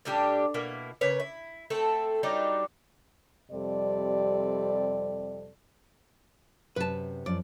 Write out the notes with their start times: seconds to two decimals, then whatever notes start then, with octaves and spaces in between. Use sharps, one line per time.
0.05 A2 G3 D4 G4
0.54 B2 A#3 E4
1.01 C#3 A#3 B4 C#5
1.20 E4
1.70 A3 C4 A4
2.23 F#3 G3 D4 D#4
3.52 F2 C3 G3 A4 D5
6.76 F#2 C3 B4 A5
7.26 F#2 F3 D5